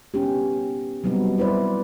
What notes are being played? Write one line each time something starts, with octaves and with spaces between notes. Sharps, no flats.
B3 C#4 D#4 G4
F#3 G3 B3 C4 D#4
E4 B4 C5 D5